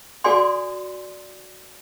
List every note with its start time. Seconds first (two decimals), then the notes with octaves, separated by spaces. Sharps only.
0.24 F#4 A4 D5 G#5 C6